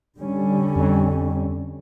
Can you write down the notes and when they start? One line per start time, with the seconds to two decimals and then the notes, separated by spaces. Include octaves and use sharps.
0.18 D3 G3 C#4
0.76 F2